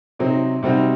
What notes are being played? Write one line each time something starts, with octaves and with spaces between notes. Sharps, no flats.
C3 F#3 C4 D#4
C3 G3 C4 D#4 F#4